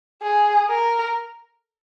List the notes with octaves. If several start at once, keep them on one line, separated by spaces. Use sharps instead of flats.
G#4
A#4